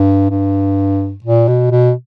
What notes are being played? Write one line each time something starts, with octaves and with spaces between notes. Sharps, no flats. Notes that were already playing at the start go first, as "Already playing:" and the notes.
Already playing: G2
G2
A#2
B2
B2